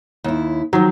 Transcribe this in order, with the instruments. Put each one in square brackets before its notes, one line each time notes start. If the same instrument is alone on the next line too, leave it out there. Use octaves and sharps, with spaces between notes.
[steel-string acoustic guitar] D#2 E4
[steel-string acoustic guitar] D#3 F3 [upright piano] F#3